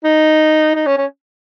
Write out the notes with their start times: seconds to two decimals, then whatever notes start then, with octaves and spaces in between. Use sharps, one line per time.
0.04 D#4
0.75 D#4
0.86 C#4
0.98 C#4